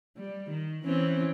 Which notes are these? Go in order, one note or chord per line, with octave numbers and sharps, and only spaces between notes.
G3
D#3
E3 C4 C#4